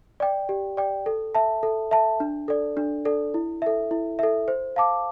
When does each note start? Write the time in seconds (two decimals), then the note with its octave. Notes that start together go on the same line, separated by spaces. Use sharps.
0.20 D5 G5
0.49 G4
0.77 D5 G5
1.06 A4
1.35 E5 A5
1.63 A4
1.91 E5 A5
2.20 D4
2.48 A4 D5
2.77 D4
3.05 A4 D5
3.34 E4
3.62 A4 E5
3.91 E4
4.19 A4 E5
4.48 C5
4.76 F5 A5 D6